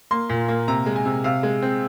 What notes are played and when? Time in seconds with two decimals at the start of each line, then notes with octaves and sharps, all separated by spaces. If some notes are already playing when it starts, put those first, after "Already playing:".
0.11 A#3 C6
0.29 A#2
0.48 A#3
0.68 C3 A#5
0.86 G#3
0.96 G#5
1.05 C3
1.24 C3 F5
1.43 G#3
1.62 C4